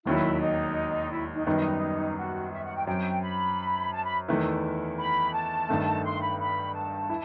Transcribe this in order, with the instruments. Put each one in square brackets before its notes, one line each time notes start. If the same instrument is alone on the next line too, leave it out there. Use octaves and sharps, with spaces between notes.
[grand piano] E1 D#2 D#3 F#3 [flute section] E4
[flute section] D#4
E4
D#4
[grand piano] F#2 D#3 G3 B3 [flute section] D#4
[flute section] F#4
E5
F#5
G5
[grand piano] F#2 F#3 C4 [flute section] G5
[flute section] B5
A5
B5
[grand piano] E2 D#3 A3 E4 B4
[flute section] B5
A5
[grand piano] G1 G2 D#3 A3
[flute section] C6
B5
B5
A5
[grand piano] E4